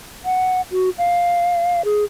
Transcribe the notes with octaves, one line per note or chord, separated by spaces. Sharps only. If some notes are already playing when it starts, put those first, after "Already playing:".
F#5
F#4
F5
G#4